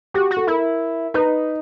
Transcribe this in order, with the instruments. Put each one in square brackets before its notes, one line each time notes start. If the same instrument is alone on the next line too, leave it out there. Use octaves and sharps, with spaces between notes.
[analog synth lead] F#4 [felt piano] G4
[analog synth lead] F#4
[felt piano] A4
[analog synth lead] E4 [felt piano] A#4
[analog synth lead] D#4 [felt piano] B4